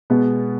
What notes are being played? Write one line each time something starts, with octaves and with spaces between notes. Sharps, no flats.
B2 G#3 B3